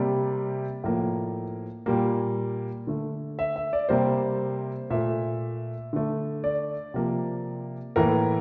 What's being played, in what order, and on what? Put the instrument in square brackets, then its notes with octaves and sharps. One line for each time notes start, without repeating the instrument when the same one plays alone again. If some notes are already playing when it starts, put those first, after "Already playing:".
Already playing: [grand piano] C3 G3 A#3 D5
A2 F3 A#3
A#2 G3 A#3
D3 A3
E5
E5
D5
C3 G3 A#3 C5
A#2 A3 E5
D3 A3
D5
C3 F3 A#3
A2 E3 A#3 A#4